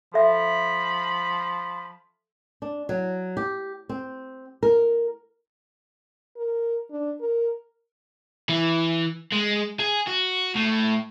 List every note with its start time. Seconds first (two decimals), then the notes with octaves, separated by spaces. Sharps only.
0.14 F3 A4 E5 B5
2.62 D4
2.89 F#3
3.37 G4
3.89 C4
4.63 A#4
6.37 A#4
6.91 D4
7.20 A#4
8.49 E3
9.33 G#3
9.80 G#4
10.07 F#4
10.56 A2